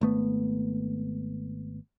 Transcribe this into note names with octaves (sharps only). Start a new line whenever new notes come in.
G#1 A3 B3